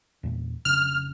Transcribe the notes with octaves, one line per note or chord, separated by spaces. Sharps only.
E2 A#2
F1 C#3 D4 F6